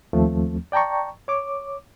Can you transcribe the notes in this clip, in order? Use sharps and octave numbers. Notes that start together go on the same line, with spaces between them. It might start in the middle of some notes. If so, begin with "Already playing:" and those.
D#2 F3 A3 C4
D5 G5 A5 A#5 C#6
C#5 D6